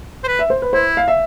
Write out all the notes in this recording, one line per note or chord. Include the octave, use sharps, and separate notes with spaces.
C5
B4
E5
C5
B4
E4 C5
F5
E5